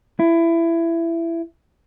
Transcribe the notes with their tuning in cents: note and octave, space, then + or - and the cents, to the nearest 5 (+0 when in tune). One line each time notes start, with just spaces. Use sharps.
E4 +20